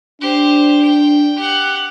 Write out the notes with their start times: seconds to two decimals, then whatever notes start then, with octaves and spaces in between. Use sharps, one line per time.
0.21 D4 G4 C5
0.82 G5
1.36 G4 F#5